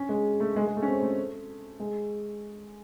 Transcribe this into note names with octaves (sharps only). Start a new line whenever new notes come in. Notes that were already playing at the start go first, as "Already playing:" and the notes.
Already playing: C#4
G#3
A3
G#3
G#3
A3
C#4
C4
A3
G#3